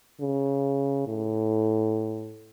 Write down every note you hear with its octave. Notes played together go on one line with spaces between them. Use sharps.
C#3
A2